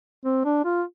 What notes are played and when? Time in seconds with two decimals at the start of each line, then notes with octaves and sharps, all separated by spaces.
0.25 C4
0.45 D4
0.65 F4